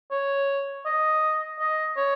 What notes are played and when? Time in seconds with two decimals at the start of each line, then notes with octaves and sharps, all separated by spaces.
0.11 C#5
0.86 D#5
1.60 D#5
1.97 C#5